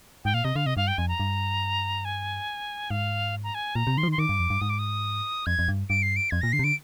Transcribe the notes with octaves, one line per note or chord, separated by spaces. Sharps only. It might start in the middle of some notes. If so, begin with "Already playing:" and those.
G#2 G5
A#2 F5
C3 D#5
D3 F5
C3 D#5
G2 F5
G5
F2 G#5
A#5
G2
G#5
G#2 F5
A#5
G#5
A#2 A#5
C3
D#3 C6
F3
D#3
C6
D#3 D6
G2
F2
G2
G#2 D#6
D6
D#6
F2 G#6
F2
G2
G2 D7
C7
D7
F2 G#6
A#2 A#6
D3 C7
C3
D3 D7